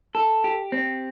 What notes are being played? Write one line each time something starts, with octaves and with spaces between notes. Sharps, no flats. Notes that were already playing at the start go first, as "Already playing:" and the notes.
A4
G4
C4